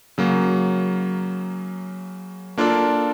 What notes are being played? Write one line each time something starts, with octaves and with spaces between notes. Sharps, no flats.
C#3 F#3 A#3
A#3 D4 F4 A4 D5